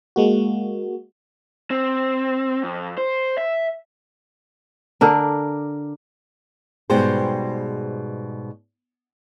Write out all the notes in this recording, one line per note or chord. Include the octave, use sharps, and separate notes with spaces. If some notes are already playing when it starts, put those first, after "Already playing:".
G#3 A#3 F#4
C4
F2
C5
E5
D3 D4 A#4
G#2 B2 G3 G#4 C5 G5